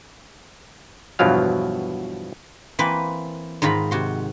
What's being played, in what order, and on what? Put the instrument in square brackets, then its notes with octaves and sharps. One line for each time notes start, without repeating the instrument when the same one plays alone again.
[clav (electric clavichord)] E2 G2 B2 F3 F#3 F5
[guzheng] E3 A#3 C4 B4
G#2 D#3 F4 A#5 B5
C3 F#4 C6